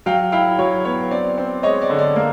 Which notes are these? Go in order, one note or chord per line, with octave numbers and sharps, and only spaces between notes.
F#3 F5 G5
E4 F5 G5
F#3 C#5
B3 C#5
C4 D5
C4
G#3 C#5 D#5
D5
D3
D5
A#3